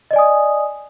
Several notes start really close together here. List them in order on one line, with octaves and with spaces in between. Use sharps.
D#5 D5 G#5 D#6